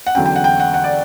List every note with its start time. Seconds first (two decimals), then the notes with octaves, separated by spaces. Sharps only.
0.07 F#5
0.15 E2 D3 F#3 C#4 G5
0.26 G5
0.36 F#5
0.44 G5
0.60 F#5
0.74 F#5
0.84 D5